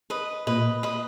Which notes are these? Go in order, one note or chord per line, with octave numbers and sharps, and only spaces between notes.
B4 D#5
A#2 B4 D#5
B4 D#5